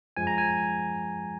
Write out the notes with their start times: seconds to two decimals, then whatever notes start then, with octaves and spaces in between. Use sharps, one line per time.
0.17 F#2 F3 G#3 G#5
0.27 A#5
0.38 G#5